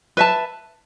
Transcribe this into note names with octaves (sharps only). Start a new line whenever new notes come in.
B4 E5 A5